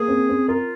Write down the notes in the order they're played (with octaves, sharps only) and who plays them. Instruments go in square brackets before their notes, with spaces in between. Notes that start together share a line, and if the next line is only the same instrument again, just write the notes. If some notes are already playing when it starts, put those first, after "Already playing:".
Already playing: [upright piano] A#3 [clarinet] G#4
[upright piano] C4
C4
[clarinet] F4 [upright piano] A#4